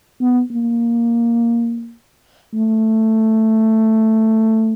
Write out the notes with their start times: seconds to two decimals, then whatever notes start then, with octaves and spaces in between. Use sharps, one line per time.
0.21 B3
0.51 A#3
2.54 A3